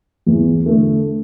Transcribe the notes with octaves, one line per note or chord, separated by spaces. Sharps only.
E2
D3 A3 D4